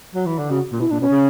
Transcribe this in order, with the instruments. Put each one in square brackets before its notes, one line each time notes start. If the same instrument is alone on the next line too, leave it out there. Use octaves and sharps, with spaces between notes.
[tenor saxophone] F#3
E3
D3
[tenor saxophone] C#3 [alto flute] F#4
[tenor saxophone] A#2
[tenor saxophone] B2 [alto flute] E4
[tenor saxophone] A#2 [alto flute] D4
[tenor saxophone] B2 [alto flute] C#4
[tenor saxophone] C#3